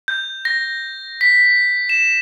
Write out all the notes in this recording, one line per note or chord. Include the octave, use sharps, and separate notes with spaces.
G6
A#6
B6
E7